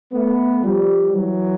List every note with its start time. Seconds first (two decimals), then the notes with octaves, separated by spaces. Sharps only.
0.12 A3 B3
0.63 F3 G3
1.13 E3 F#3